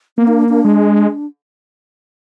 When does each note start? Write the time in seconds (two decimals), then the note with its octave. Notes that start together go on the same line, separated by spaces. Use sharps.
0.18 A#3 B3
0.28 D#4
0.33 D4
0.49 D4
0.65 G#3